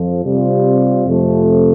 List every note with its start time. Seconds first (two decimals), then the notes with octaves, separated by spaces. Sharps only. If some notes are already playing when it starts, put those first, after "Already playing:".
Already playing: F2 F3
0.25 C3 G3 C4 F4
1.07 F2 C3 A3